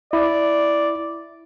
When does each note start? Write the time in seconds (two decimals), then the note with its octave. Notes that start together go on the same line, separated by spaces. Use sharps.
0.13 E4 D5